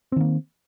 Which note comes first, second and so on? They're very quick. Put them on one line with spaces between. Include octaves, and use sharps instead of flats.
C4 D#3 A#3